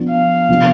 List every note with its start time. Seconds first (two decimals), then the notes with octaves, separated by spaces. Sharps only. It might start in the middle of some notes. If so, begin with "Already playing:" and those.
Already playing: F3 B3 D4
0.10 F5
0.49 C3 F3 B3 D4